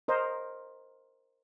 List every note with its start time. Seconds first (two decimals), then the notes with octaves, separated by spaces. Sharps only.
0.08 A#4 C5 D#5